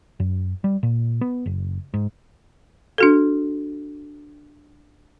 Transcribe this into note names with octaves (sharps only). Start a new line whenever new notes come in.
F#2
G3
A#2
B3
F#1
G#2
D4 F#4 A4